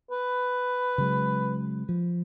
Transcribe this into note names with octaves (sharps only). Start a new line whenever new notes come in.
B4
C#3 F#3 G#3
F3